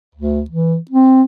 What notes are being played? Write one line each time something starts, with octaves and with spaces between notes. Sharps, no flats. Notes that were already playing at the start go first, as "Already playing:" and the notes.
D2
E3
C4